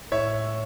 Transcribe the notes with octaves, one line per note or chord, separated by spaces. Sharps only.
A2 C#5 E5